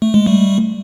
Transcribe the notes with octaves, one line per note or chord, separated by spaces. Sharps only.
A3
G#3
G3 A3